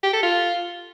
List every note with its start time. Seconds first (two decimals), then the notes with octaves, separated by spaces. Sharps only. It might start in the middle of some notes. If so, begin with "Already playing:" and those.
0.04 G4
0.13 A4
0.23 F4